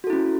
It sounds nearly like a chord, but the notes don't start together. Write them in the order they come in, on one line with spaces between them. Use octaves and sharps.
F#4 A4 E4 C#4